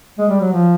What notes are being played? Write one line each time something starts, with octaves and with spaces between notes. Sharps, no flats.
G#3
G3
F#3
F3